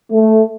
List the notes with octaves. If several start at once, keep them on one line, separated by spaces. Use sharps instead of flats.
A3